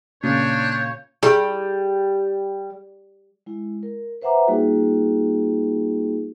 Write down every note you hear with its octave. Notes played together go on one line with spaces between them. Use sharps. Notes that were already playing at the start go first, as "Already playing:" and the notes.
A#2 C#3 D4 C#5 G6
G3 E4 G4 G#4
G#3 E4
A#4
B4 C5 E5 F#5 A#5 D6
G3 A#3 D#4 F4 F#4 G#4